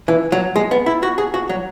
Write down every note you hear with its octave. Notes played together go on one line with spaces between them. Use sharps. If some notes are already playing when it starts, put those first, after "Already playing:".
E3
F#3
G#3
B3
E4
F#4
G#4
F#4
F#3